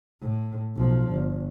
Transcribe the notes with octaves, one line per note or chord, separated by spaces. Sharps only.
A2
B1 F3
G1